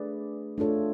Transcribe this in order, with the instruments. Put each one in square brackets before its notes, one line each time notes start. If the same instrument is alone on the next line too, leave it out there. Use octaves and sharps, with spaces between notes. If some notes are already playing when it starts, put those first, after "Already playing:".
Already playing: [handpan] A3 D4 G#4 B4 D5
A3 D4 F4 A4 C#5